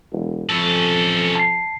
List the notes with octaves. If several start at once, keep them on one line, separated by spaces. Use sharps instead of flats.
E1
F2 C#4 A4
A5 C7